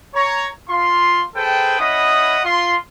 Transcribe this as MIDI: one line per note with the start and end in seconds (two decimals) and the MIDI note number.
0.14 0.47 73
0.14 0.47 82
0.69 1.23 65
0.69 1.23 84
1.35 1.77 68
1.35 1.77 69
1.35 1.77 71
1.35 1.77 72
1.35 1.77 79
1.80 2.39 61
1.80 2.39 64
1.80 2.39 75
1.80 2.39 78
1.80 2.39 83
1.80 2.39 87
2.44 2.75 65
2.44 2.75 84